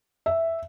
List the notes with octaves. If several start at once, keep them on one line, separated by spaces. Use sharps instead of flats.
E5